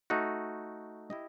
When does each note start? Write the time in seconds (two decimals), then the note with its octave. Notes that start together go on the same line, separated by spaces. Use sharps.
0.10 A3 D#4 F#4
1.10 E4 G4 D#5